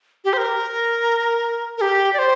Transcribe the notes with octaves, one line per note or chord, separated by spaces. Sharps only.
G4
C5
A#4
A#4
G4
D5
C5